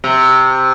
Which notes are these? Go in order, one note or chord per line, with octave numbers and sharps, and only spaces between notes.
C3